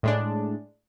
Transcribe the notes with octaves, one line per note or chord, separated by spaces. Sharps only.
A2 G#3 D4